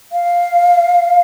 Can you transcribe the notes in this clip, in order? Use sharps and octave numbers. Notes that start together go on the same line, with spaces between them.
F5